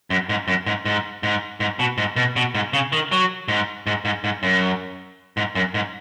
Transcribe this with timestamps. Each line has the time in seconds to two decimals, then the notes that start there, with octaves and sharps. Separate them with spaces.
0.10 F#2
0.29 G#2
0.48 F#2
0.66 G#2
0.85 G#2
1.23 G#2
1.60 G#2
1.79 B2
1.98 G#2
2.16 B2
2.36 B2
2.55 G#2
2.73 C#3
2.92 D#3
3.12 F#3
3.48 G#2
3.87 G#2
4.05 G#2
4.24 G#2
4.43 F#2
5.37 G#2
5.55 F#2
5.74 G#2